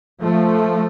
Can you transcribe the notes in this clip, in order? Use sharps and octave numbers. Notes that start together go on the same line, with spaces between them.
F3 A3